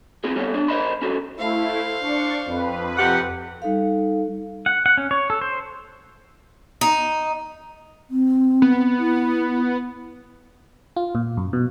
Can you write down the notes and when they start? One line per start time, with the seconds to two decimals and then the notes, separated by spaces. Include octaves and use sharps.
0.24 C4 F4 G#4
0.36 G3 B3 G4 A4 C#5
0.54 D4 C#5
0.68 A#4 C5 D5 D#5 B5 C6
1.02 C#4 F#4 A4
1.37 A3 E4 C5 F5
2.00 D4 C#6
2.46 F2 B4
2.97 C3 G4 F#5
3.62 G3 D#4 A4 F5
4.66 F#5
4.86 F#5
4.97 C#4
5.11 C#5
5.30 A4
5.41 C5
6.81 D#4
8.10 C4
8.62 B3
8.99 E4
10.96 F4
11.15 A#2
11.37 F#2
11.53 B2